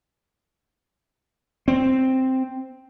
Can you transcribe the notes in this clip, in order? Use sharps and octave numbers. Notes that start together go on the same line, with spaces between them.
C4